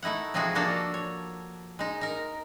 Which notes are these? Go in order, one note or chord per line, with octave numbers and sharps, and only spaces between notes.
A3 D#4 E4 F#5
C3 F3 G#3 D#4 F#4 G#4
F3 A#3 D4 F#4 A4 A#4
C#5
G#3 D#4
D#4 A#4